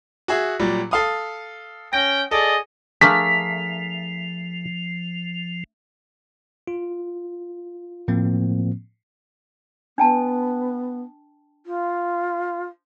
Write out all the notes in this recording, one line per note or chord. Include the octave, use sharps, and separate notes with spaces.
F#4 G#4 E5
A#2 F#3 G3
A4 F5 D#6
C#4 G5 A#6
G#4 A4 D5 D#5
F3 A3 D4 G#4 A#4 F5 B6
F4
A2 F3 A#3 C4
B3 D4 G5 A5
F4